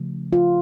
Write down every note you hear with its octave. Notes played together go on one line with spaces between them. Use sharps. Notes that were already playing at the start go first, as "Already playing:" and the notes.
Already playing: C#3 F3 A3
F4